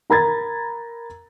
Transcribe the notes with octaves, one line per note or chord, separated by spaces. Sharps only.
A#4 A#5 B5 G#6 A6